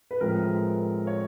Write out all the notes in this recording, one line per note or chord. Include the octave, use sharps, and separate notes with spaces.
B4
A2 F3 G#3 C4 A#4
C#5